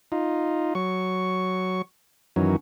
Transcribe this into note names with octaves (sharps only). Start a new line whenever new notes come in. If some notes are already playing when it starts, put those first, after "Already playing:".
D#4 F4
F#3 C#6
F#2 D#3 E3 F#3 C#4